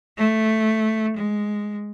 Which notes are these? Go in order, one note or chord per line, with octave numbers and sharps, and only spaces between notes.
A3
G#3